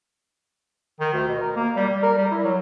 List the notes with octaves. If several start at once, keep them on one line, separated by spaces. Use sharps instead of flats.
D#3
D2
B2
A#4
A#3
G3
G3
A#4
G3
E4
F#3